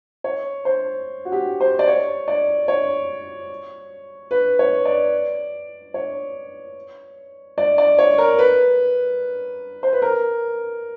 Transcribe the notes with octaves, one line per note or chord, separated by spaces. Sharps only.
C#5
C5
F#4
G4
C5
D5
C#5
D5
C#5
B4
C#5
D5
C#5
D5
D5
C#5
A#4
B4
C5
B4
A#4